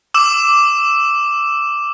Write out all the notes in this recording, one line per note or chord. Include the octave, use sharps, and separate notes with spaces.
D6 E6 E7